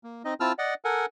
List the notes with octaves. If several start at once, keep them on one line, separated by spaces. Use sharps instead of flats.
A#3
C4 D#4 D#5
C4 E4 F4 A5 E6 F6
D5 D#5 F#5
A4 A#4 F#5 G#5